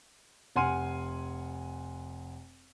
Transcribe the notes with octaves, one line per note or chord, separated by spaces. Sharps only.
F1 F#5 G#5 C6 F6 D#7